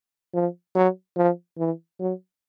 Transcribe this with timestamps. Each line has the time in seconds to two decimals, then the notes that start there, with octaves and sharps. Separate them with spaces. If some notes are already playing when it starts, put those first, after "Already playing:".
0.34 F3
0.75 F#3
1.17 F3
1.58 E3
2.00 F#3